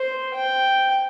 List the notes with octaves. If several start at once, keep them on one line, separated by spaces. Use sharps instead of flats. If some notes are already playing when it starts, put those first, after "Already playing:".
Already playing: C5
G5